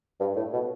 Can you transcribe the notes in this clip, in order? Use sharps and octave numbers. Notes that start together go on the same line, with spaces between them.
G2
A2
B2